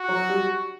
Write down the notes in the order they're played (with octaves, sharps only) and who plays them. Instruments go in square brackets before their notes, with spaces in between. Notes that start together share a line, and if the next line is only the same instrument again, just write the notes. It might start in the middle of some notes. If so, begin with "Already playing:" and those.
Already playing: [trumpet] F#4
[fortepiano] F#3
G3